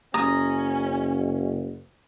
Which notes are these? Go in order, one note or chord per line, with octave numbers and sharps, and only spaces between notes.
F#1 C#4 A#5 D#6